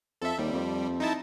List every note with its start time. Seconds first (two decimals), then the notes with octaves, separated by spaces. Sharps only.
0.22 F2 A4 E5
0.39 D#2 G3
0.53 F2
1.00 D#4 E4 A5